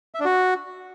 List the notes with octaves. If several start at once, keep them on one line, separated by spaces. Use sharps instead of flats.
E5
D4
F#4